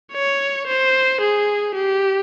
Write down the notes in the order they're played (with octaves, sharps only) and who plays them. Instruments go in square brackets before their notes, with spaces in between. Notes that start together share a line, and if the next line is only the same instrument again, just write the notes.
[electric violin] C#5
C5
G#4
G4